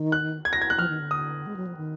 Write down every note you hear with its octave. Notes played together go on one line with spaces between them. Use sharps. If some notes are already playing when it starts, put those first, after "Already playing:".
Already playing: D#3
F#6
G#6
A#6
G#6
F#6
F3 F6
D#3
D3
D#6
G#3
F#3
F3
D#3